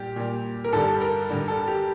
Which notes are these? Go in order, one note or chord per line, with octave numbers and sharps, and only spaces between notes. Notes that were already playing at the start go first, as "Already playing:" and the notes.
Already playing: A#2 G3 G4
A#2 G3
A#4
G2 D3 G3 A4
A#4
G2 D3 G3
A4
G4